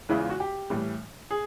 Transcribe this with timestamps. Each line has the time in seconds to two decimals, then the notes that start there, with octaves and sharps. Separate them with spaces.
0.09 E2 C#3 E3 G#3 E4
0.20 F4
0.30 F#4
0.40 G4
0.70 A2 E3 G3
1.31 G#4